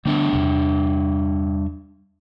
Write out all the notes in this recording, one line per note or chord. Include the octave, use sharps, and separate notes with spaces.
D3 G3 A3 B3 D4 E5
E2 C3